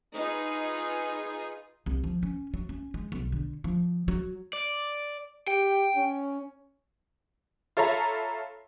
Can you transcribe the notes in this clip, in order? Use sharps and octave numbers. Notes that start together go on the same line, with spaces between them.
D#4 F4 G#4 B4
C2
F3
C#4
F#3
C#4
G#3
B1
D3
F3
F#3
D5
G4 G5
C#4
F4 A4 C#5 E5 A#5 B5